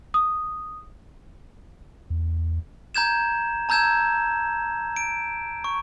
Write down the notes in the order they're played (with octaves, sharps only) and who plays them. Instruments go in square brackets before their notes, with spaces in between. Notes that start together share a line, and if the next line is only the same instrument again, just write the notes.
[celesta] D#6
[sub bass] E2
[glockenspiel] A#5 G6 G#6 E7
A5 A#5 E6 G6 G#6 E7
D7
C#6